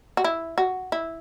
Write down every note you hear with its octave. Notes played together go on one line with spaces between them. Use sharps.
F#4
E4
F#4
E4